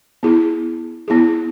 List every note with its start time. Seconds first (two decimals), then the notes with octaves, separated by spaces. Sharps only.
0.23 B3 E4 G#4
1.08 B3 E4 G#4